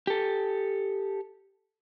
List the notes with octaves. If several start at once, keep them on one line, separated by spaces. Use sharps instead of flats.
G4 A4